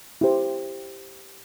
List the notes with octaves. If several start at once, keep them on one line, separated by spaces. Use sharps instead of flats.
E4 G4 C5